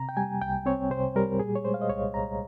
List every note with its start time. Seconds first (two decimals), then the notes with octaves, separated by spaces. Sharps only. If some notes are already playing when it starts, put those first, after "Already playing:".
Already playing: C3 A#5
0.09 G5
0.17 G3 G#5
0.42 C2 G5
0.66 C4 C#5
0.90 C3 C5
1.16 G3 A#4
1.39 A#2 G#4
1.55 C#5
1.65 G#3 C5
1.74 F5
1.81 D#5
1.89 C2 C#5
2.14 C2 A#5